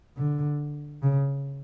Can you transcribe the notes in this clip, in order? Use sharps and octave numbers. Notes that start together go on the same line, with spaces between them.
D3
C#3